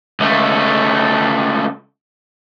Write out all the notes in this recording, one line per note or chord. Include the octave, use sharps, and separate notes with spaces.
C#2 A3